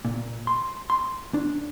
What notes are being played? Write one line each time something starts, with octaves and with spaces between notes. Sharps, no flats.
A#2
C6
C6
D4